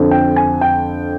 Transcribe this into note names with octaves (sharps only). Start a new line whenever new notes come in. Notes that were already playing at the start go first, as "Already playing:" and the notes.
Already playing: F2 D3
G5
G#5
G5